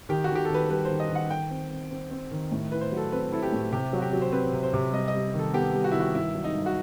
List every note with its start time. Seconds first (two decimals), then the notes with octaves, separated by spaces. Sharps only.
0.09 D#3 G4
0.24 F#4
0.29 D#3
0.35 G4
0.45 A4
0.50 D#3 B4
0.70 G3 B4
0.85 D#3 C5
1.00 D#5
1.10 D#3
1.15 F#5
1.30 D#3 G5
1.51 C4
1.70 C4
1.91 C4
2.11 C4
2.31 D#3
2.51 A2
2.71 E4 B4
2.81 C5
2.92 F#3 A4
3.12 C4 B4
3.33 E4 A4
3.43 G4
3.52 A2
3.72 C3 G4
3.93 F#3
3.98 F#4
4.02 G4
4.13 F#3
4.21 C5
4.32 C4 B4
4.53 C3
4.63 C5
4.73 C3
4.93 G3 D#5
5.08 D#5
5.14 G3
5.34 D#3
5.39 A4
5.53 B3 G4
5.74 G3
5.84 F#4
5.92 D#3 E4
6.00 F#4
6.14 G2 E4
6.35 F#3
6.44 D#4
6.55 G2
6.66 F#4